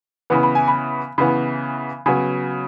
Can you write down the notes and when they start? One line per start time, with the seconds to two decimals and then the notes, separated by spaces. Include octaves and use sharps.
0.30 C#3 E3 B3
0.43 B5
0.55 G#5
0.68 B5
1.18 C#3 E3 B3
2.06 C#3 F#3 B3 G#5